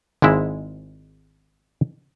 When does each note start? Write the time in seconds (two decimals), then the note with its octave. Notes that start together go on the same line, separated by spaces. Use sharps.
0.22 G#1 G#2 G#3 E4